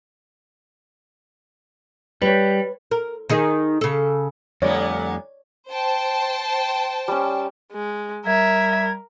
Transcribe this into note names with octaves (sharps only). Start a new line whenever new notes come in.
G3 B4 C#5
A#4
D#3 D#4 G#4
C#3 A4
F2 A#2 D3 G3 A3 B3 C#5 D5
C5 G5 A5
G3 C#4
G#3
G3 A#4 E5 G#6